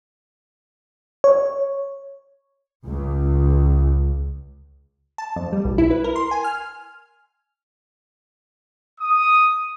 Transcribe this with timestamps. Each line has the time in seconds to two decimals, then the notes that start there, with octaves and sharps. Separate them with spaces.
1.24 C#5
2.86 C#2
5.18 A5
5.36 F2
5.52 G3
5.65 B1
5.78 E4
5.91 B4
6.04 A#4
6.16 C6
6.31 G#5
6.44 F6
9.01 D#6